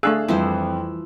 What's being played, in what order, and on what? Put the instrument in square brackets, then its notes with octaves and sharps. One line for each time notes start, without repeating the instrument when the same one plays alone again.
[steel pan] A3 D4 G#4 [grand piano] F5 E6 F#6
[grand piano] F2 [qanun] E3 F3 C5 [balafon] G3